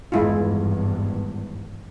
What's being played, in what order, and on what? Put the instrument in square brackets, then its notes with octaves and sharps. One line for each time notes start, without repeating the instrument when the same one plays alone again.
[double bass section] G#1 E2 G2 [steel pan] G#3 E4 F4